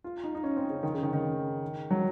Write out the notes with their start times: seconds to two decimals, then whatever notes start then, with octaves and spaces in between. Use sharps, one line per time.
0.04 F4
0.24 D#4
0.35 D#4
0.44 C#4
0.56 C4
0.70 C#3
0.83 D#3
0.94 C#3
1.03 D#3
1.13 D#3
1.91 F#3